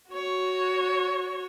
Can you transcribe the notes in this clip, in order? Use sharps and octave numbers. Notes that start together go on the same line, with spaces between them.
F#4 C#5